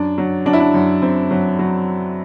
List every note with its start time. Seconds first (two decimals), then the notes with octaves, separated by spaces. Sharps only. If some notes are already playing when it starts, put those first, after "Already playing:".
Already playing: F#2 D4
0.18 F#3
0.46 F#3 D4
0.53 E4
0.60 D4
0.74 F#2
1.02 F#2 C4
1.31 F#3
1.59 F#3